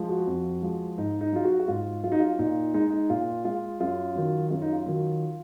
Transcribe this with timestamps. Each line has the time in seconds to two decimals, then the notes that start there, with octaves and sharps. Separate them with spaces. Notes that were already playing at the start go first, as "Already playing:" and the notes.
Already playing: F3 G#3
0.09 F#4
0.27 F2
0.62 F3 G#3
0.98 G#2 D#4
1.21 D#4
1.33 F#3 F4
1.45 F#4
1.59 F#4
1.68 G#2 F4
2.04 F#3 F4
2.12 D#4
2.20 F4
2.39 A#2 D#4
2.74 G#3 D#4
2.90 D#4
3.10 A#2 F4
3.45 G#3 F4
3.80 F#2 F4
4.15 D#3 F#3
4.51 F#2 F4
4.62 D#4
4.72 F4
4.86 D#3 F#3